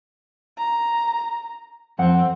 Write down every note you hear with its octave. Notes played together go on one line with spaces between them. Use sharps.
A#5
F2 C4 F#5